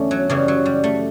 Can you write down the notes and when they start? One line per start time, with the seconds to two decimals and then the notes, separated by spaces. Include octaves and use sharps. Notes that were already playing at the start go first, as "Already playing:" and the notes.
Already playing: E2 D3 A3 C#4
0.11 F#3
0.29 F#2 C#3 E3 G3
0.48 F#3
0.66 G3
0.84 A3